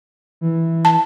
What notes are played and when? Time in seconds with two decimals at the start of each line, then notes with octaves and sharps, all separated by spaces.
0.41 E3
0.85 A5